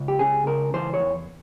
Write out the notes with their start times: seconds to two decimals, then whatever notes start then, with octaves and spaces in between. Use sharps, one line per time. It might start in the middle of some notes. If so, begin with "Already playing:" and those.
Already playing: C#2
0.08 G4
0.19 C#3 G#4
0.47 C#2 A#4
0.74 E3 C5
0.94 C#5
1.00 E2